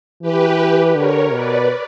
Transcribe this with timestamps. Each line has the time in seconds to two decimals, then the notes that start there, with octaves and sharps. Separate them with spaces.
0.22 E3 G4 B4
0.96 D3 A#4 C#5
1.32 B2 B4 D5